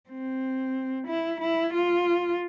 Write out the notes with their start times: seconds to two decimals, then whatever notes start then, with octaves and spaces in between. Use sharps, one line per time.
0.10 C4
1.07 E4
1.41 E4
1.74 F4